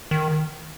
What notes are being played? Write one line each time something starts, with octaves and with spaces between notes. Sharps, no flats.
D#3